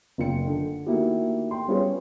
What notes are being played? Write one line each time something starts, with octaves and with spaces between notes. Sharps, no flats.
F#1 F4 G5 C#7
D3
D#3 A3 A#3 E4 F#4 G4
G5 C6
G3 C#4 F4 G#4 B4 C#5